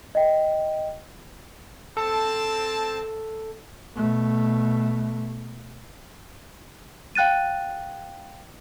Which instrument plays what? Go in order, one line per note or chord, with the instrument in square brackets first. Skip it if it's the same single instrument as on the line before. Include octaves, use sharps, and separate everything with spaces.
[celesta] D#5 E5 G5
[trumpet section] C4 A5 [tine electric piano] A4
[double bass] B2 A3
[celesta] F5 G5 F#6 A6 D#7